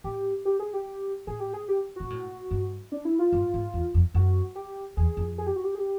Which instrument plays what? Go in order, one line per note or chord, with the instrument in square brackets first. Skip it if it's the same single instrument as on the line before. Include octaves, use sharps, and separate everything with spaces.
[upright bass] A2 [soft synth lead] G4
[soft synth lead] G4
G#4
G4
[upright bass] A2 [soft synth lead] G#4
[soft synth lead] G4
G#4
G4
[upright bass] A#2 [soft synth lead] F#4
[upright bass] A2
G2
[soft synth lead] D4
E4
F4
[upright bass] G2
G#2
E2
F2
[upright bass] F#2 [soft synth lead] F#4
[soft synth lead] G4
[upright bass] E2 [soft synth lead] G#4
[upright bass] F2
[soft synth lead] G#4
G4
F#4
G4
G#4
G4